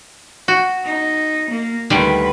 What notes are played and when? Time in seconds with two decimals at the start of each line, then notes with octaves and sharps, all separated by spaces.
0.48 F#4
0.84 D#4
1.50 A#3
1.90 D2 D3 D#3 G3 B4